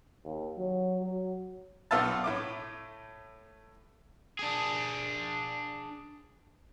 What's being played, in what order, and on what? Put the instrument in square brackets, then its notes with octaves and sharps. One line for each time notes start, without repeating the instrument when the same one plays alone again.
[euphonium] D#2
F#3
F#3
[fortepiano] B1 B3 F4 E5 A5
A2 A3 D6
[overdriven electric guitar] D4 G#4